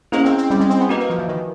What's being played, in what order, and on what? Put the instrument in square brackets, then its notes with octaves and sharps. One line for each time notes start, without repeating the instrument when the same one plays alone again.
[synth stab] A#3 [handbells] C#4 E4 G#4 C5 D#5
[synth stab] C4
C4
G3
G#3
C4
B3
[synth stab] A#3 [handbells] F#4 B4 D#5
[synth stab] A#3
F3
E3
D#3